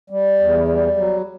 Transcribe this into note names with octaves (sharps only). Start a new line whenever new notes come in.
G3
E2
G3
F#3